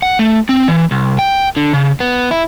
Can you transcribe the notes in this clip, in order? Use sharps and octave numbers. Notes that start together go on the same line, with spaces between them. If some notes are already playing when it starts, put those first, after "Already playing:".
F#5
A3
C4
E3
C2
G5
D3
C#3
B3
E4